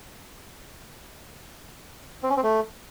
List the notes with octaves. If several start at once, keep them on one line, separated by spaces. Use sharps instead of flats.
C4
C#4
C4
A3